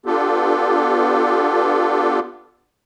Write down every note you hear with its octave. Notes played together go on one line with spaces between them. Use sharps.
B3 D4 F4 G4 A4